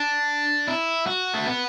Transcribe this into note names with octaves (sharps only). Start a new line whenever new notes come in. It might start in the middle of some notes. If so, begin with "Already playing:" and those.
Already playing: D4
E4
F#4
A3
B3